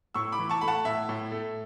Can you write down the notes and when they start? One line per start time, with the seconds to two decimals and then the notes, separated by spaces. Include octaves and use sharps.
0.14 A2 C#6 E6
0.32 B5 D6
0.39 E3
0.50 A5 C#6
0.61 A3 B5
0.68 F#5 A5
0.85 A2 E5
1.09 A2
1.32 A3